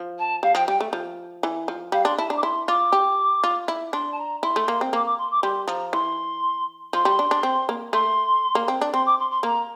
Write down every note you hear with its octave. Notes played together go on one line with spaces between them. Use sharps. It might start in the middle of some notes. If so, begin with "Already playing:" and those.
Already playing: F3
A5
G3 F5
F3 G5
G3 G5
A3
F3
E3
F3
G3 F5
D4 C6
E4 A5
D4 A#5
D6
E4 C6
F4 D6
G4
F4
E4
D4 C6
A5
A#5
E4 C6
A3
A#3
C4
A#3 D6
D6
C6
D6
G3 C6
F3 A#5
E3 C6
F3 C6
G3
D4
D4
C4
A#3
A3 C6
A#3
C4
D4
C4 C6
D6
C6
C6
A#3 A#5